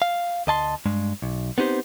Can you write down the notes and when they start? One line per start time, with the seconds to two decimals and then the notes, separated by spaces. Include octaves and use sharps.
0.02 F5
0.47 D2 D#5 A5 C6
0.85 G2 G#3
1.22 B1
1.58 B3 C4 D#4 G4 C5